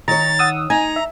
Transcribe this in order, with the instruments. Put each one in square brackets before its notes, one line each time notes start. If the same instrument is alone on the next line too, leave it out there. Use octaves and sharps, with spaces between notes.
[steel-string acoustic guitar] D#3 C#5 [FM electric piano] A#5 [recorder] A6
[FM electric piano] F#5 D#6 E6
[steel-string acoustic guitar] D#4 [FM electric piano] G#5 [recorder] A#5
[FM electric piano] E5